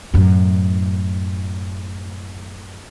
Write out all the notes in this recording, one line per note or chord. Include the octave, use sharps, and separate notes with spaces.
F#2 A2